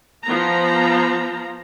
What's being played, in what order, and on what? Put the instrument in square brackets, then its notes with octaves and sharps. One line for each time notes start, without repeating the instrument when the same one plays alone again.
[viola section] F3 B3 A#5